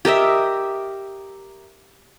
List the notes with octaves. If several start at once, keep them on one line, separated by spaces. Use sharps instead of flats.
G4 A#4 D#5 E5